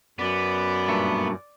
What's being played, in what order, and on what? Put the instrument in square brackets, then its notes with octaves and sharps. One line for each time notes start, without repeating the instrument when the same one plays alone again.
[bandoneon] F#2 [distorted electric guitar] B3 [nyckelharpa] D5
[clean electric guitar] G2 A#2 A3